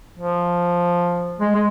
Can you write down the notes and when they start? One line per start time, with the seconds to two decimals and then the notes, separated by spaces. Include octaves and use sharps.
0.18 F3
1.40 G#3
1.55 G#3